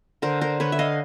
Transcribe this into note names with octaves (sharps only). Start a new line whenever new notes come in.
D3 A#4 C5
A#4 C5
D3 B4 C#5
E5
D#5 F5